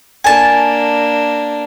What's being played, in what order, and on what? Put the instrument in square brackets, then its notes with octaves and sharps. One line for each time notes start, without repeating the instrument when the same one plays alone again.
[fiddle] A#3 D4 [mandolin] G#5 A5